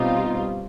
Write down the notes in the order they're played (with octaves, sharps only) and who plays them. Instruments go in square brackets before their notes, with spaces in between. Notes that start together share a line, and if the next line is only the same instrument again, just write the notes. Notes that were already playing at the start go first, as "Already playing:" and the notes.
Already playing: [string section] B2 G3 C4 F4 [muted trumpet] D#4